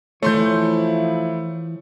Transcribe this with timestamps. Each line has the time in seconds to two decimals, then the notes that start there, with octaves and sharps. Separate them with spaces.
0.23 E3 F3 A3 E4 C#5 C6 G6